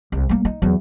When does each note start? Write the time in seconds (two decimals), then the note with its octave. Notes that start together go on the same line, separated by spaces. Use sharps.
0.12 C2
0.29 G3 A#3
0.45 D#4
0.62 E2 F#3